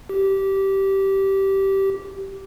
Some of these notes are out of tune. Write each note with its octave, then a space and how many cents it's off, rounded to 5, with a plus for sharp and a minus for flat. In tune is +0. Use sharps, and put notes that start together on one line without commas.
G4 -15